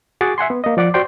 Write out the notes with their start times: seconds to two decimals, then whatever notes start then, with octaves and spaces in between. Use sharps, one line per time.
0.21 F#4 G#4 F#5 D6 A6
0.38 E5 F#5 G#5 C6
0.50 B3
0.64 A#3 D#5
0.77 F3 D5 F#5 D6
0.94 F#4 C5 D5 G5 C6